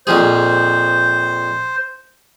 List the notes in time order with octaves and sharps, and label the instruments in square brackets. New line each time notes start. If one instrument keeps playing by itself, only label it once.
[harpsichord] A#1 F2 G#4 [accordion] C5